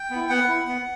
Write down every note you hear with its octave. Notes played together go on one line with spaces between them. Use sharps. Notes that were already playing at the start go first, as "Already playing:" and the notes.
Already playing: G5
B3
E4
B3 F#5
E4
B3